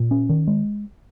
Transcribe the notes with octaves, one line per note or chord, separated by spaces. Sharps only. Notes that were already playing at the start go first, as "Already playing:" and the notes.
Already playing: A#2
C#4
D#3
G#3